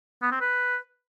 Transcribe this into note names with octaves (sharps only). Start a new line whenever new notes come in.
B3
C4
B4